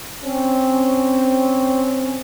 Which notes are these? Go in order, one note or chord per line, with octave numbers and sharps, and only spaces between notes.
C4 C#4